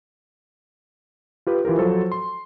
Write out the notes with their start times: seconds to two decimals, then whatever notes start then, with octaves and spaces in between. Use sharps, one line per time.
1.47 F4 G4 B4
1.65 E3 F4 G4 A#4
1.78 F3 F#3 A4 C5
2.12 C6